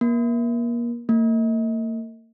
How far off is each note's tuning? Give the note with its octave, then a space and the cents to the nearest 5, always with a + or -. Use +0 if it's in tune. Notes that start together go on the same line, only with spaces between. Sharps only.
A#3 +30
A#3 -40